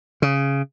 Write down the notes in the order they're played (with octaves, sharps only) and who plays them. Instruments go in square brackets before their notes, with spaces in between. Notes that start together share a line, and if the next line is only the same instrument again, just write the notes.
[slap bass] C#3